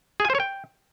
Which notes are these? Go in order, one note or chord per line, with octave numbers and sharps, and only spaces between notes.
G#4
G#5
C5
C#5
G5